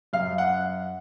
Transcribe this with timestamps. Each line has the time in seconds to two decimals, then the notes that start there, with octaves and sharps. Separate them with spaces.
0.13 F#2 F5
0.38 F#5